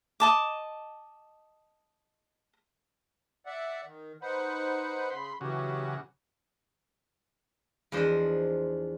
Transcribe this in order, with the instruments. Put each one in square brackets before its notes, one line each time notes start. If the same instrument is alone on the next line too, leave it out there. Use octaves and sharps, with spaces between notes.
[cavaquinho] D#5 A5 D6
[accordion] D5 E5 F#5
D#3
[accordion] D#4 C5 F#5 [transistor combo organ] B4
[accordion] C#3 [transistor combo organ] B5 C6
[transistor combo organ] C#3 F#4 [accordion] E3 F#3 G4
[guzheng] E2 F3 D4 C5 D#5